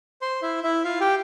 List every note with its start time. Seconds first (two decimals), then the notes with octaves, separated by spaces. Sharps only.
0.22 C5 C6
0.42 E4 E5
0.64 E4 E5
0.85 F4 F5
1.01 G4 G5